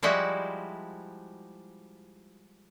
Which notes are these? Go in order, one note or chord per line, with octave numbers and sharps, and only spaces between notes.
F3 G3 G#3 E4 F#4